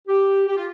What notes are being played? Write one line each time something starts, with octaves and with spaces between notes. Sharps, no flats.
G4
G4
F4